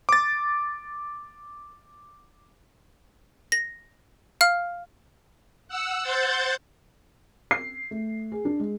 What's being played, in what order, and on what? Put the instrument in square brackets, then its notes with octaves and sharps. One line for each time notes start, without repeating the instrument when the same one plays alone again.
[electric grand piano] D6 A6
[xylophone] A#6
F5 F6
[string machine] F#5 E6
C5 F#5 G6 A6
[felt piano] C7
A3
G#4
D4
G#3